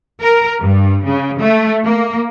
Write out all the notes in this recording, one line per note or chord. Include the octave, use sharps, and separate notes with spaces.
A#4
G2
C#3
A3
A#3